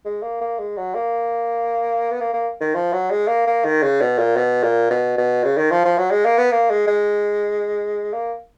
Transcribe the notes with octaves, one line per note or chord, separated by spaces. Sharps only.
G#3
A#3
A#3
G#3
F#3
A#3
B3
A#3
A#3
D#3
F3
F#3
G#3
A#3
A#3
D#3
C#3
B2
A#2
B2
A#2
B2
B2
C#3
D#3
F3
F3
F#3
G#3
A#3
B3
A#3
G#3
G#3
A#3